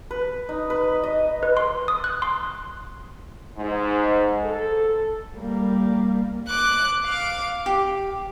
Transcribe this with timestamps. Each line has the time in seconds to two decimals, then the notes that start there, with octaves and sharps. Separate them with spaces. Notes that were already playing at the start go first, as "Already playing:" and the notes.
0.11 B4
0.49 D#4
0.70 B4
1.03 D#5
1.43 B4
1.57 C6
1.88 D#6
2.04 F#6
2.22 C6
3.57 G#2
4.43 A4
5.37 G3 A#3
6.48 D6 F#6
7.05 F5 D6
7.66 G4